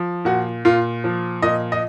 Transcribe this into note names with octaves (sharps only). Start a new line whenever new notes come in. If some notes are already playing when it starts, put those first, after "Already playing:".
Already playing: F3
A#2 F#4
A#2 F4
F3
A#2 D#5
D#5